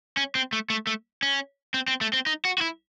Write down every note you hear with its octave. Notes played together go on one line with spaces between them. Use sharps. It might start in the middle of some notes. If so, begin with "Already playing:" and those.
C#4
C4
A3
A3
A3
C#4
C4
C4
A3
C4
D#4
F#4
F#4
E4